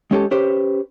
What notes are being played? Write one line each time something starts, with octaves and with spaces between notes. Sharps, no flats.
G#3 C#4 G4 A4
C#4 G4 B4 C5 C6